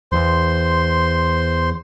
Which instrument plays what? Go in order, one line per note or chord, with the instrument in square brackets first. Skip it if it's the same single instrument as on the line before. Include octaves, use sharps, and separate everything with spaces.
[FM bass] E2 [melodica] C5 C6